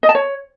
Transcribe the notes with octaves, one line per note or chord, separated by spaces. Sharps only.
D#5
A5
C#5